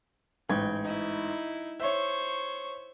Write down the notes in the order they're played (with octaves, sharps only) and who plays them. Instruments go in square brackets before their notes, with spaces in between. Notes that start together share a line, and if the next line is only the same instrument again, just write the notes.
[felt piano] A1 G#2 G#6 [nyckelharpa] G5
[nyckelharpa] D#4 E4
[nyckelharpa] C5 C#6 [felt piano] C#5 E5